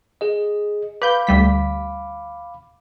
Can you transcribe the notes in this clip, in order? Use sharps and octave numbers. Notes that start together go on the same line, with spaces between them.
G#4 D#5
B4 F5 B5 D6 G6
D2 G3 B6